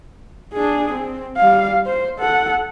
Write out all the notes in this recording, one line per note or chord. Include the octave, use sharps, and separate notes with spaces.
D4 G#4
C4
G3 F5
C5
A4 F#5